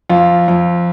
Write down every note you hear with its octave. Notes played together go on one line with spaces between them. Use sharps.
F2 F4
F2